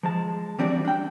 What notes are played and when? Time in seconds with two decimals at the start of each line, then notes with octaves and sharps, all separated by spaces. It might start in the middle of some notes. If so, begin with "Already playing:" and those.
0.03 F3 G#3 A5
0.59 E3 G3 C4 D4 F#4 D5
0.85 D4 G5